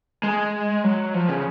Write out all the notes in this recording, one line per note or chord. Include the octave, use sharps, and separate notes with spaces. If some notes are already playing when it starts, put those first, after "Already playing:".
G#3
F#3
F3
C#3